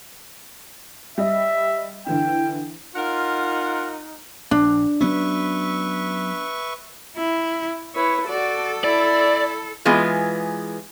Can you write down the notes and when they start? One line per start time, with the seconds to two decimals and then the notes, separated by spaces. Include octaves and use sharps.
1.18 G3 D#5 E5
2.07 D3 E3 E4 G5
2.95 D#4 F4 A#4 F#5
4.51 A#1 D4
5.01 F#3 B3 C#4 B4 E5 C#6
7.16 E4
7.95 E4 B4 C#5
8.27 F#4 A4 D5
8.84 E4 D5
9.85 E3 G#3 B3 F4 G#4